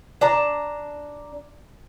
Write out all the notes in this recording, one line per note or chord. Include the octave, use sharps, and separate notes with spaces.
D4 A5 A#5